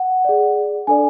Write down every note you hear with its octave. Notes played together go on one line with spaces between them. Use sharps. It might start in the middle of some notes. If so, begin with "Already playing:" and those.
Already playing: F#5
G#4 D5
D4 A4 D5 G#5